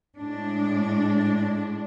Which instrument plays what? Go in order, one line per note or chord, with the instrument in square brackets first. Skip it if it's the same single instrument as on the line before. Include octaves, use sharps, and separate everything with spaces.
[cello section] A2 G#3 D4